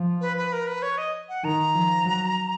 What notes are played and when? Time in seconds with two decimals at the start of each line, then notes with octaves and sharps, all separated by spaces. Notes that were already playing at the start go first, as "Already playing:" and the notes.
Already playing: F3
0.21 B4
0.37 B4
0.53 A#4
0.68 B4
0.82 C#5
0.98 D#5
1.29 F#5
1.44 D#3 A#5
1.74 F3
2.05 F#3